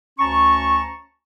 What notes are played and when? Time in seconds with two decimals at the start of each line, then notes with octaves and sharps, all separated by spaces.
0.19 D2 C#4 A5 A#5 C#6